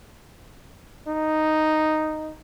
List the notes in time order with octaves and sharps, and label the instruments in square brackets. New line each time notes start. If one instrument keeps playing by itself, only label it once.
[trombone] D#4